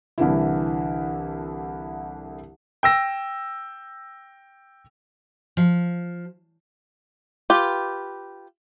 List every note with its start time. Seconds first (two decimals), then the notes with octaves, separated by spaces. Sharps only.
0.18 C2 D3 E3 E4
2.83 G5 E6 A#6
5.57 F3
7.50 F4 G4 B4